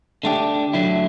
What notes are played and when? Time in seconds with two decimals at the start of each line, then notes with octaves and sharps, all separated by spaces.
0.23 D3 A3 D4 G4
0.73 D3 F#3 A3 E4